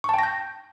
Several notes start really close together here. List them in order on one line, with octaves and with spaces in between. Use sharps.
C#6 A5 G5 A#6 G6